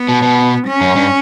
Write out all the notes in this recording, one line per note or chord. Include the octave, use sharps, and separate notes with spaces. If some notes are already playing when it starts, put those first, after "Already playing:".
Already playing: B3
B2
B2
C#4
F#2
G2